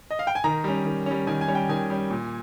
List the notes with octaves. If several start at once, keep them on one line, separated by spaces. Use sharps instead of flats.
D#5
F5
G5
G#5
D#3 A#5
G3 C#4
D#3
G3 C#4
D#3 G#5
G#5
G3 C#4
G5
D#3 G#5
G3 C#4
A#2